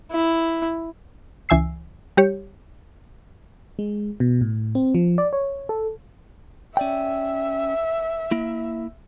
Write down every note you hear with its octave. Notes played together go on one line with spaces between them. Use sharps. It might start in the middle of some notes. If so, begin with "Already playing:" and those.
E4
C#2 E3 G#5 E6 C7
G3 G4 C#5
G#3
B2
A2
C4
F3
D5
C#5
A4
C#4 D5 E5 G5
A#3 E4